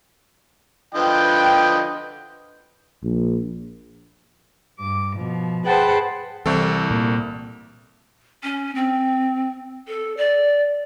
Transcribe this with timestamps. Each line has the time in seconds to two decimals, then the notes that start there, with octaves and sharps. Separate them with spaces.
0.95 D3 F3 B4 D#5 G5
3.03 A#1
4.78 G2 D6
5.16 B2 F3
5.65 G#4 B4 C5 F#5 G5 A5
6.46 C2 E3 C4 A4
6.91 A#2 A#3
8.44 C#4
8.75 C4
9.88 A4
10.17 D5